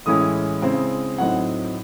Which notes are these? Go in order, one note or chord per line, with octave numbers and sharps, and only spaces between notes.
A2 E3 G#3 C#4 E4 D#6
C#3 G#3 C4 E4
A2 F#3 C4 D#4 F#5